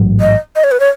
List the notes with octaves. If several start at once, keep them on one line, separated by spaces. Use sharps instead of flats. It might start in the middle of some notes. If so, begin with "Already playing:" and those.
Already playing: A1 G#2 F#3
D#5
D#5
C#5
B4
C#5